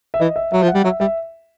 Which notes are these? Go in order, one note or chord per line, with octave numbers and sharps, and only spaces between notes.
E5
E3 D#5
E5
F#3 E5
F3
F#5
G3
F#3 E5
G3 E5